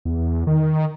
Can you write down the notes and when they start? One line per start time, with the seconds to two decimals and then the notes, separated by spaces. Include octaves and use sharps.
0.05 E2
0.47 D#3